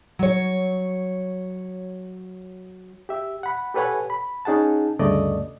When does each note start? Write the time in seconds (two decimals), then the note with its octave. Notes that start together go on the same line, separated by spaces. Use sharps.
0.19 F#3 C#5
3.09 G4 E5
3.43 F#5 B5
3.74 G4 A4 B4 C#5 F#5 G#5
4.10 B5
4.45 C#4 D#4 G#4 F#5 A5
4.99 D2 G2 C#3 A3 D5 D#5